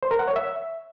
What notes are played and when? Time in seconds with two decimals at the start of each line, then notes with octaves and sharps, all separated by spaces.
0.03 C5
0.11 A#4
0.19 F#5
0.28 C#5
0.36 E5